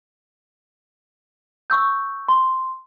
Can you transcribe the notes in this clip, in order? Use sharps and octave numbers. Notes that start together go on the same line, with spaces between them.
C#6 E6 G6
C6